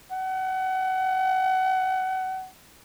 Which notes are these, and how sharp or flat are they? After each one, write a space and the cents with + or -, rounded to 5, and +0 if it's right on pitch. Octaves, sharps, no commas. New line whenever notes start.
F#5 +30